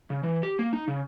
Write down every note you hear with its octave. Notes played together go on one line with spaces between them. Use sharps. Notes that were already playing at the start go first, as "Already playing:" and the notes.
C#3
E3
G4
A#3
D#4
C#3